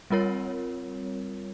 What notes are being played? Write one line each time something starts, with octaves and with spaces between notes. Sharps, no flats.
G3 C4 F4 A#4 C#5